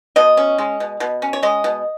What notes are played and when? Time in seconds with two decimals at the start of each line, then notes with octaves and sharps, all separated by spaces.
0.16 B2 D#5
0.37 C#4
0.58 G#3
0.80 B2
1.00 B2
1.22 C#4
1.33 C#5
1.43 G#3 D#5
1.64 B2